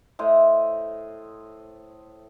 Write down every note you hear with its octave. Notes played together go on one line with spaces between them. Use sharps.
A2 C5 D#5 E5